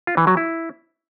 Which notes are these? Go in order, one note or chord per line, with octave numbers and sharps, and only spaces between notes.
F4
E3
F#3
E4